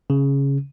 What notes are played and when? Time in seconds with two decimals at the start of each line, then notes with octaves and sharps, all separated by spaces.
0.10 C#3